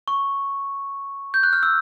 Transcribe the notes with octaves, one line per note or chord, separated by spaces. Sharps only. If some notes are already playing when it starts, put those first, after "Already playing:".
C#6
G6
F#6
F6
E6